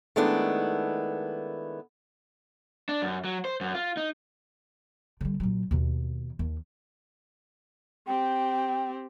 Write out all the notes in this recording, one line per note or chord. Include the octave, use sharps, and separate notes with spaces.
D#3 G#3 A3 B3 D4 E4
D4
F#2
F#3
C5
F#2
F4
D#4
D3 G3
A#2 F#3
D#2 B2
D#2
C4 G4 G5